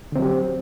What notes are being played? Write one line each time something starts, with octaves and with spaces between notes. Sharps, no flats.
D3 F#3 C4 G4